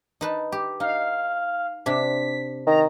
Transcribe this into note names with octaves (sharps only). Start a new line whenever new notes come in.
D#4 B4 A5
G4
D#4 F5
C3 D4 B6
D#3 A#5